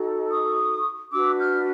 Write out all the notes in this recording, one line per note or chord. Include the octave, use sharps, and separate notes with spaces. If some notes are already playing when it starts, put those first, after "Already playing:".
Already playing: D#4 F#4 A4
C#6 D#6
D4 F#4 B4 D6 E6
F6 G6